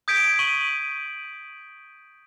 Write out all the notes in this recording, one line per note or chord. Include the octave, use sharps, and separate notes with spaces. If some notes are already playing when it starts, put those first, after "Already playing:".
D#6 G6 G#6 B6 D7
C#6 D#7 F#7